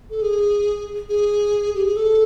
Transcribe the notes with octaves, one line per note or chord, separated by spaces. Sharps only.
A4
G#4
G#4
G4
G#4
A4